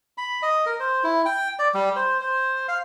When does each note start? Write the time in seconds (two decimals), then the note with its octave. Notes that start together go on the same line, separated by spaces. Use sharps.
0.18 B5
0.43 D#5
0.66 A#4
0.80 C5
1.04 E4
1.26 G5
1.59 D5
1.74 G3
1.96 C5
2.21 C5
2.68 F5